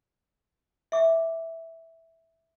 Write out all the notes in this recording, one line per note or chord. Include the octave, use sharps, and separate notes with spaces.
E5 D6